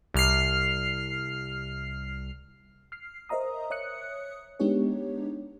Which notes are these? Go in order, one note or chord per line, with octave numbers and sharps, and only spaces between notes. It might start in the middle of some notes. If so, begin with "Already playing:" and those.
C2 F6 C7
F6 C7
A#4 C5 D#5 E5 A#5 D#6
C#5 E5 D#6 F#6 C#7
G#3 B3 D4 D#4 G4 C#5